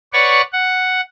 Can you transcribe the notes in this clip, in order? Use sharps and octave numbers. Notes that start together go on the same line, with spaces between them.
B4 C#5 D5 F#5 C#6
F#5